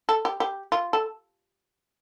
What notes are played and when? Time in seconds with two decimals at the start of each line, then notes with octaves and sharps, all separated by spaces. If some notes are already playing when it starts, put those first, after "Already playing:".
0.09 A4
0.25 G4
0.40 G4
0.72 F4
0.93 A4